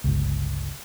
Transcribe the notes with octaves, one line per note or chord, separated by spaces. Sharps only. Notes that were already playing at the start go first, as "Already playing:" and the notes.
G1 C#2